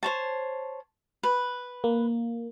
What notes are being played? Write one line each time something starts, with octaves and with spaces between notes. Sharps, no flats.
C5 C#5 A5
B4
A#3